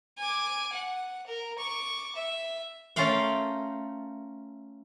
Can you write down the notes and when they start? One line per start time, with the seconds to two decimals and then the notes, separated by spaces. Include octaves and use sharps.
0.18 G#5 D6
0.73 F#5
1.27 A#4
1.58 C#6 D6
2.16 E5
2.96 A3 C#4 F4 A#4 F5 G5